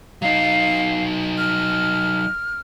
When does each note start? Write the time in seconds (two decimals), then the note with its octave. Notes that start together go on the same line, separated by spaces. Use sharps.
0.22 F#3 D#4 F5
1.38 F6